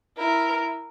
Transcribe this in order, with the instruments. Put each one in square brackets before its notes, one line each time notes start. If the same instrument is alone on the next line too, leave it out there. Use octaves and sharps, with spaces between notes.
[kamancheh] E4 [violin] A#4